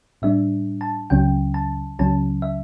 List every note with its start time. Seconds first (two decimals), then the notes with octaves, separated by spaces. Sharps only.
0.22 A2 G3 D4 E5
0.81 A5
1.10 C#2 C#3 F#3 C#4 G5
1.54 A5
1.99 C#2 C#3 F#3 C#4 A5
2.42 E5